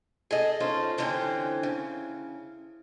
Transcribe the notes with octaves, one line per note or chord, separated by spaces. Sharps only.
G#4 A4 D#5
C#4 D#4 F4 A4 C5
G2 D3 E3 C4 C#4
C#3